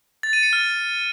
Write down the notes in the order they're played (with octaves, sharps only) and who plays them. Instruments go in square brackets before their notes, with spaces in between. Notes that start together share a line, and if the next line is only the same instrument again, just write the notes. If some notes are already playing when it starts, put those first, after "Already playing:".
[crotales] A6
D#7
C#7
F6